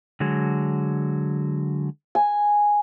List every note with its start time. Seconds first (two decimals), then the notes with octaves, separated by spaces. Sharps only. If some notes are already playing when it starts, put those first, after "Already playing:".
0.20 D3 F#3 G#3
2.15 G#5